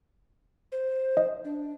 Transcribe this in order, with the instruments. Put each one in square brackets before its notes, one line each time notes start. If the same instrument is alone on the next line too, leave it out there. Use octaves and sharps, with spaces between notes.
[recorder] C5
[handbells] D#5
[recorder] D4